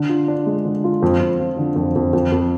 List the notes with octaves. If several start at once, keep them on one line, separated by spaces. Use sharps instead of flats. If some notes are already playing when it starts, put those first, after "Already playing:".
Already playing: D3
F4
D4
G#3
D3
F4
F2
F2
F3
D3
F2
F2
F2
F2